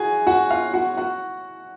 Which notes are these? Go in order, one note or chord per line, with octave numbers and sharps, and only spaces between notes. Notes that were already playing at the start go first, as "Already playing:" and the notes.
Already playing: F#4 G#4 G#5
F#4 F#5
F4 F5
F#4 F#5
F#4 F#5